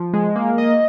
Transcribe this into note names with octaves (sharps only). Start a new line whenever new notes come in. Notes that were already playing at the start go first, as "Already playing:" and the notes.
Already playing: F3
G#3
A#3
D#5